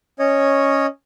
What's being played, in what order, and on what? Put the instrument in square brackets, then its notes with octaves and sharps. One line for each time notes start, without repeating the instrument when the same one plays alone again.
[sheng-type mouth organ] C#4 C#5 D#5